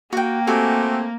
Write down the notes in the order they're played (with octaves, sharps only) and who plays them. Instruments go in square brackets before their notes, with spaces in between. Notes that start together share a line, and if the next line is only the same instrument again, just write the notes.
[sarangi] A#3 [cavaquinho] F#4 G5
[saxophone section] A3 C4 [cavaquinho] F#4 G4 G#5